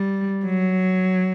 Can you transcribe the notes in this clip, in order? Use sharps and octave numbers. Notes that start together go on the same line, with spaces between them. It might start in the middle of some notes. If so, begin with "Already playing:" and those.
Already playing: G3
F#3